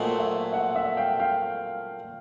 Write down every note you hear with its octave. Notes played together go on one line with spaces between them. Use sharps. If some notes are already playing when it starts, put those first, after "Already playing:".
Already playing: A#2 F#3 A3 C4 D#4 F#5 G#5
E5 F#5
E5 F#5
E5 F#5
F5 G5
F5 G5